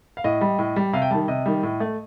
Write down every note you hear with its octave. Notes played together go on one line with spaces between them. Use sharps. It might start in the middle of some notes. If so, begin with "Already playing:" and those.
F5
A2 D#5
G3
A2
G3
C3 F5
G5
D#3 G3 A5
C3 D#5
D#3 G3
A2
A3